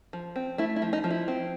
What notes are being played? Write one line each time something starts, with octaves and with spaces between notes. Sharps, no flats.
F3
C4
A3 E4
E4
F3
D#4
F3
E4
C4